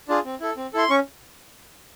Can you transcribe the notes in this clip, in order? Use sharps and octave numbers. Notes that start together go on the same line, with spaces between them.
D4 F4 G#4
C4
E4 A4
C4
E4 A4 C6
C#4 C#6